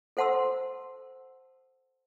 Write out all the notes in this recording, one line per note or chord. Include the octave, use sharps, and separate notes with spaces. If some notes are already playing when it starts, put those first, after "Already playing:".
A4 C5 F#5 A5 C6 E6